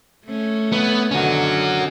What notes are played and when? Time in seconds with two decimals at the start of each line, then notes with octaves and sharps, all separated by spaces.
0.25 A3 C#4
0.72 B3
1.11 B2 D3 D#3 C#4 F#4